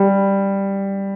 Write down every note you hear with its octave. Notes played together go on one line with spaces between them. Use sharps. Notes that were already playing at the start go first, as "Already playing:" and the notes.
Already playing: G3